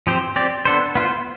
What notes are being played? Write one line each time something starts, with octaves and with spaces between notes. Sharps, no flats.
F3 C4 G4 C5
C4 G4 D5
B3 D4 A4 C5
B3 F4 C5